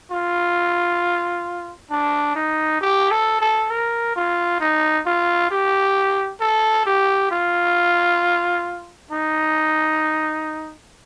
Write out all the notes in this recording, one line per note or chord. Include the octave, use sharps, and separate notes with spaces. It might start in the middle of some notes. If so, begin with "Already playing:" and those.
F4
D4
D#4
G4
A4
A4
A#4
F4
D#4
F4
G4
A4
G4
F4
D#4